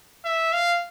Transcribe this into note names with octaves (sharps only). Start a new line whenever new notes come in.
E5
F5